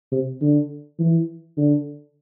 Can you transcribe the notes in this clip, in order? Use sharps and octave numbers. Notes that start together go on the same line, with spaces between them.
C3
D3
E3
D3